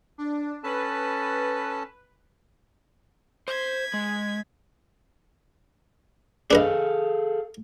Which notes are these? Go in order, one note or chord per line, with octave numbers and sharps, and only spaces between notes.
D4
C#4 A4 B4 A5
C5 G#6 B6
G#3
D4 G#4 A4 B4 D#5 F5